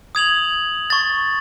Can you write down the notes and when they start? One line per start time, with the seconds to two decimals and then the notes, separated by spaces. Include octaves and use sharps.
0.15 D#6 G#6 F7 F#7
0.90 C#6 A6